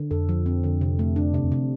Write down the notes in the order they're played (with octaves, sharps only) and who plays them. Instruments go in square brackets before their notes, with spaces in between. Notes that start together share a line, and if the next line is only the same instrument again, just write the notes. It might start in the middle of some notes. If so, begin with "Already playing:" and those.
Already playing: [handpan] D3
[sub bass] F2 [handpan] A4
[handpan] F3
C4
D3
C3
A3
D4
C3
[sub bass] F2
[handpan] C3